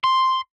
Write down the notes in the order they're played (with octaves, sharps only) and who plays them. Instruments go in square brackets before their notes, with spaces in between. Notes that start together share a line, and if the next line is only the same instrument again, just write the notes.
[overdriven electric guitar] C6